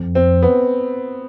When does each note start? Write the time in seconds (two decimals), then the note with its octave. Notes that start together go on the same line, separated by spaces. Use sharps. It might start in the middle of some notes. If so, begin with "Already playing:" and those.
Already playing: F2
0.15 C4
0.43 B3